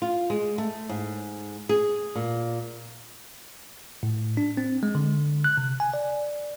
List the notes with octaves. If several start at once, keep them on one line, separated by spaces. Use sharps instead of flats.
F4
G#3
A3
G#2
G#4
A#2
A2
D4
C4
G#3
D3
F#6
C3
G#5
D5